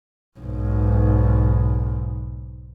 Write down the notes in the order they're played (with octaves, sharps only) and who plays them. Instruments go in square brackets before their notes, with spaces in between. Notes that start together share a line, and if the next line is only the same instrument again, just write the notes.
[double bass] B1 G#2